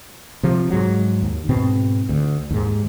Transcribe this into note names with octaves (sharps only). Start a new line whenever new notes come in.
C3 F3
G#2 F#3
D#2
G#2 B2 C4
D2
D#2 G#2